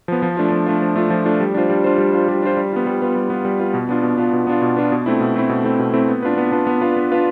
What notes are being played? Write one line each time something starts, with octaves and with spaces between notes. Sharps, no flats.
F3 B3
F3
A3 D4 F4
F3
A3 D4 F4
F3
A3 D4 F4
F3
A3 D4 F4
G3
D4 F4 C5
G3
D4 F4 C5
G3
D4 F4 C5
G3
D4 F4 C5
G3
B3 F4
G3
B3 F4
G3
B3 F4
G3
B3 F4
B2
B3 D4 F4
B2
B3 D4 F4
B2
B3 D4 F4
B2
B3 D4 F4
B2
A3 C4 E4
B2
A3 C4 E4
B2
A3 C4 E4
B2
A3 C4 E4
B3
D4 F4 B4
B3
D4 F4 B4
B3
D4 F4 B4
B3
D4 F4 B4